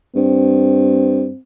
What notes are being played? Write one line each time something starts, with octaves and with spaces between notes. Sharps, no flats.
G2 C4